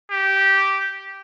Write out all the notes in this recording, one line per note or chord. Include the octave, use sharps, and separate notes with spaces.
G4